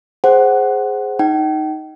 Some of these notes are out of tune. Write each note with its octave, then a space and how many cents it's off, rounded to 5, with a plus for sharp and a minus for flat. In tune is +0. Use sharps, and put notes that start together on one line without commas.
G#4 +0 C5 +0 F#5 +15
D#4 +0 G5 -40